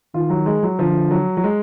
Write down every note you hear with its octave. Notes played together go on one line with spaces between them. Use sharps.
D#3 F4
F#3
G#3
F#3
D3 F3
F#3
F#3
G#3